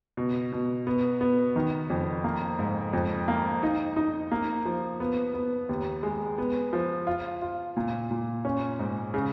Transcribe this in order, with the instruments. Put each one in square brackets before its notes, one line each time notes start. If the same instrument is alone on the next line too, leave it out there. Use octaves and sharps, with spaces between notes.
[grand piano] B2
B2
B3
B3
D#3
F2
A#3
G#2
F2
A#3
D#4
D#4
A#3
F3
B3
B3
D#2
G#3
B3
F3
F4
F4
A#2
A#2
C#4
G#2
C#3